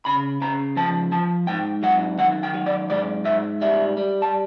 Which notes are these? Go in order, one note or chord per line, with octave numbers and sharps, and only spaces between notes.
C#3 B5
C#3 A#5
F3 A5
F3 A5
G#2 G5
F#3 F#5
D#3 F#5
G5
F#3
D5
G#2 D5
G#2 E5
G3 E5
G3
A5